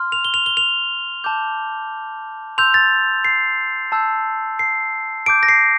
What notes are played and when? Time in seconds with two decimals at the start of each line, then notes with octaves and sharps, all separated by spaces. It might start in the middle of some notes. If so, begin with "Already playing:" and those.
Already playing: C6 F6
0.12 F7
0.25 G7
0.34 F7
0.46 G7
0.57 F7
1.24 A5 D6 G6
2.58 C6 E6 G6 F7
2.74 A6
3.25 C7
3.92 A5 E6 G6
4.59 C7
5.26 A5 D6 G6 D7
5.43 A#6
5.48 C7